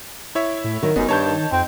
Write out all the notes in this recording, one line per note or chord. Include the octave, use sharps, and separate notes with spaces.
E4 C#5 E5
A2
D#3 F#3
F1 F#2 B3 D#4
G2 D#3 C#5 A5 G6
F2 C4